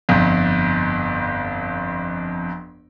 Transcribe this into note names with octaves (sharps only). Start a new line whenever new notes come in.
G1 F2